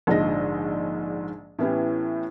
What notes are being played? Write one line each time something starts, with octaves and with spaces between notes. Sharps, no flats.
A#1 G#2 D3 F3 D#5 A#6
A2 E3 B3 C#4 E4 G4